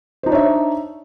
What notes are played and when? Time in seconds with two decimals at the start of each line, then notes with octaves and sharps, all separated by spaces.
0.23 C5
0.26 D#4
0.29 D4
0.32 C#5
0.35 E5